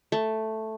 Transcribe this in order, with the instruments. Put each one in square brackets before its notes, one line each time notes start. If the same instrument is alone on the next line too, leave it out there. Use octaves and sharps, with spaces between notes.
[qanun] A3